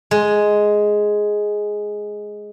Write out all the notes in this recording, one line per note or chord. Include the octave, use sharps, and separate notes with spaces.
G#3